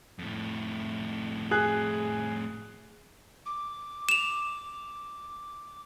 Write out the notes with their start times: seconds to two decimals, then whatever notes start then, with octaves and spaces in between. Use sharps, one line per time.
0.19 F2 A2
1.51 G#4 F#6
3.46 D6
4.09 E7 F7